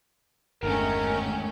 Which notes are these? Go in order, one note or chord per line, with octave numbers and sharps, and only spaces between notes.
G1 E2 G#2 D#3 A3 C#4 D4 A#4